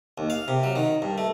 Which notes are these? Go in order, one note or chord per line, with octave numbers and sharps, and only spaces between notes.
D#2
F5
C3
F#3
D#3
G2
A3